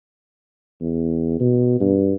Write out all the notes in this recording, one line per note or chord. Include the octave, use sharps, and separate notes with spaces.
E2
B2
G2